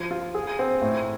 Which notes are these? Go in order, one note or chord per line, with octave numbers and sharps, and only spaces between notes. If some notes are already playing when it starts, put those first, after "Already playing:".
Already playing: F3
F4
G#4
C4
A2